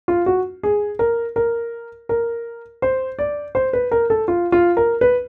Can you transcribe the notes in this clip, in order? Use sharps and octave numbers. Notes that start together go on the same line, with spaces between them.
F4
F#4
G#4
A#4
A#4
A#4
C5
D5
C5
B4
A#4
A4
F4
F4
A#4
B4